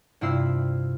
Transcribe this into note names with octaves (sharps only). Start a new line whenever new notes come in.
G2 C3 E4 F4 E6 C7